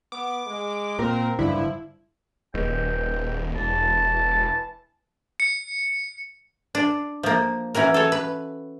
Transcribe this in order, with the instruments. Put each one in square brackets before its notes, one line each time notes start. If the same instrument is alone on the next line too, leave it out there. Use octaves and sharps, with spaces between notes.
[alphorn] B3 [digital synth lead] D6
[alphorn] G#3
[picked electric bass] A#2 [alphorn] C4 [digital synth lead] A#4
[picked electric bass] F#1 G2 D3 [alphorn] F3 [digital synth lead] E4
[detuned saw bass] D#1 [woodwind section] C#2 G#2 G5
[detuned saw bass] E1 [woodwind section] E3 A5
[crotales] C#7
[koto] D4
F3 A#3
E3 C#4 F#4 A#4
A4 C#5
B4